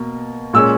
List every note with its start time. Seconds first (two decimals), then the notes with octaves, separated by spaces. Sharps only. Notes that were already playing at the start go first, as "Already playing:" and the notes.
Already playing: B2 A#3
0.53 A#2 G#3 C#4 E6